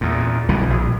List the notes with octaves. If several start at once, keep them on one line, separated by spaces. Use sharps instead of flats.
E2 A#2
B1 E3 G3
A#1